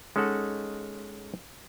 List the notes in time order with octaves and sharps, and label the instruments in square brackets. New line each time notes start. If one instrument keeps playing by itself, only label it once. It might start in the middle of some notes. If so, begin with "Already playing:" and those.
[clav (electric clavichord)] G#3 C#4 D#4 A4 F#5